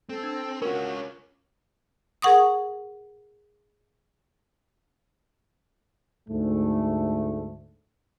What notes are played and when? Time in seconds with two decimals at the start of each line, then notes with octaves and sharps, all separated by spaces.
0.09 C4 A4
0.23 D4
0.62 C#4 F4 F#4 A#4
2.22 G#4 A#4 F#5 C#6 D#6
6.29 D2 G#2 A3